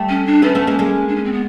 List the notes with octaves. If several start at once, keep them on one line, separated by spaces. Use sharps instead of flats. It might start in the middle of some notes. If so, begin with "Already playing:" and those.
Already playing: G3 A3
C#4
D4
A3 B3 C#4
A3 B3
G#3 A#3
G#3 A#3
D4
C#4
C4
B3